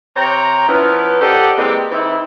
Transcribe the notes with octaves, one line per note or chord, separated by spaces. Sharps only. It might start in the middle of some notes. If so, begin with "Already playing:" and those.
C3 C#5 G5 A#5
F3 B3 C#4 E4 A#4 B4
G4 A4 C5 D5 D#5 F#5
E3 G#3 A#3 C4 G4
E3 C4 D#4 E4